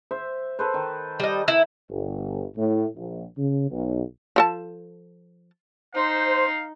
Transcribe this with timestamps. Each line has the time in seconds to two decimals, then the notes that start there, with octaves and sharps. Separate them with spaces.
0.11 C5 E5
0.59 A4 B4 C5
0.74 D#3
1.20 G3 D#5
1.48 E4
1.90 G1
2.57 A2
2.97 A#1
3.38 C#3
3.71 B1
4.36 F3 A4 A5
5.94 D#4 C5 F5